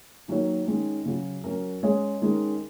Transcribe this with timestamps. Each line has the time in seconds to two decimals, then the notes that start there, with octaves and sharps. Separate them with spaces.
0.28 D#3 F#3 A#3 F#4 C#5
0.67 D#3 G#3 C#4
1.05 C#3 F#3 C#4 F#4
1.44 F#3 C#4 A#4
1.83 G#3 C#4 G#4 C#5
2.21 D#3 G#3 C#4 A#4